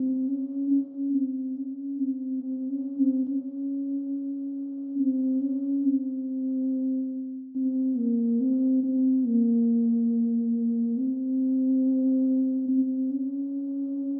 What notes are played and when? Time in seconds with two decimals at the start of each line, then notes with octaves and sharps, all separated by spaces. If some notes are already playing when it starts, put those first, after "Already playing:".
Already playing: C4
0.28 C#4
0.71 C#4
1.13 C4
1.56 C#4
1.99 C4
2.42 C4
2.70 C#4
2.99 C4
3.27 C#4
4.99 C4
5.41 C#4
5.84 C4
7.55 C4
7.97 A#3
8.40 C4
8.83 C4
9.26 A#3
10.97 C4
12.68 C4
13.11 C#4